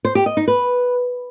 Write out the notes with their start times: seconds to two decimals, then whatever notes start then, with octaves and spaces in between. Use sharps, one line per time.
0.05 C5
0.15 G4
0.26 D#5
0.37 D#4
0.48 B4